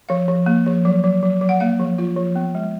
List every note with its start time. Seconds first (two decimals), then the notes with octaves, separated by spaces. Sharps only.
0.09 F3 F5
0.28 F3
0.46 A#3
0.66 F3
0.85 F#3
1.04 F#3
1.23 F#3
1.41 F#3
1.49 F#5
1.60 A#3 F5
1.80 F3
1.98 F4
2.16 F3
2.36 B3
2.55 G#3